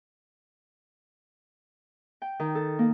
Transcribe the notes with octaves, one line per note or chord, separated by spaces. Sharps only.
G5
D#3
A4
A#3